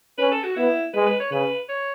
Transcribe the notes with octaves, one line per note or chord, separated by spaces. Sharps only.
C#4 B4
A4
F#4
B3 E4
G#3 B4
B4
C#5
C#3 B4
C#5